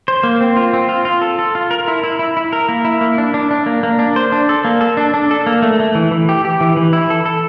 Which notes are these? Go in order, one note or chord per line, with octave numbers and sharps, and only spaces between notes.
C5
A#3
C4
F4
C4
F4
F4
A4
A4
F4
A#4
E4
E4
E4
E4
A#4
A#3
E4
A#3
D4
D4
D4
A#3
A#3
D4
C5
D4
A4
A#3
A4
D4
D4
A4
A#3
A3
A3
E3
E3
G4
G4
E3
E3
E4
A4
A4